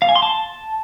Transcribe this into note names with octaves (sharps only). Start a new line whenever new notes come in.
F5
G#5
C6
A5